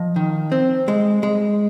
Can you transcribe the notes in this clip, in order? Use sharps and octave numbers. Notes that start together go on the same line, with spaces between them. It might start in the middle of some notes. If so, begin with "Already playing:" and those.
Already playing: F3 D#5
D#3
C4
G#3
G#3